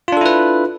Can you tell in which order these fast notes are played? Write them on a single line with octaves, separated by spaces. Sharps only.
F4 D4 A4 E4 B4